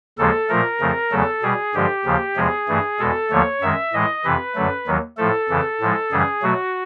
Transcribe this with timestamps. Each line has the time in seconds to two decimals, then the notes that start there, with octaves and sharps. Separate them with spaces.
0.18 D#2 C#3 F3 G#3 A4
0.49 A#2 F3 A3 A#4
0.80 F2 C#3 F3 A3
1.11 E2 C#3 F#3 A3 A4
1.42 B2 G3 G#4
1.74 G2 D3 F3 G#3 G4
2.05 D#2 C#3 F3
2.36 E2 C3 F3 G#3 G#4
2.68 G2 E3 A3
2.99 E2 B2 G#3 A4
3.30 D#2 D3 F3 A3 C#5
3.61 F#2 D#3 G#3 E5
3.93 A2 E3 G#3 D#5
4.24 F2 C3 E3 B4
4.55 F#2 D3 F#3 A3
4.86 D#2 D#3 F#3
5.17 A2 F3 A3 A4
5.49 F2 C#3 E3
5.81 A2 F3 G#3
6.12 F#2 C#3 E3 G3 G#4
6.43 B2 F#3 A3 F#4